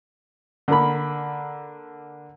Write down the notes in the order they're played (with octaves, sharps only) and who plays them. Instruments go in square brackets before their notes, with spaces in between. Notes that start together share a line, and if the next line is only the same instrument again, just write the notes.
[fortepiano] D3 A#3 B5